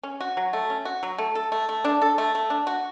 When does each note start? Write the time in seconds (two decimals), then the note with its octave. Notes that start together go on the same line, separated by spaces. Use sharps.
0.03 C#4
0.20 F#4
0.37 F#3
0.53 A3
0.70 C#4
0.85 F#4
1.03 F#3
1.18 A3
1.35 A4
1.52 A3
1.69 A3
1.85 D4
2.02 A4
2.18 A3
2.35 A3
2.50 D4
2.67 F#4